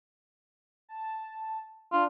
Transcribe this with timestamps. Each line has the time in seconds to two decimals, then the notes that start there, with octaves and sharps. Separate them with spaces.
0.89 A5
1.93 D4 F4